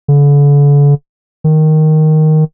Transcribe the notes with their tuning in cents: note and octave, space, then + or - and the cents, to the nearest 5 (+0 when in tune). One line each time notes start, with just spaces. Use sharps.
D3 -40
D#3 +0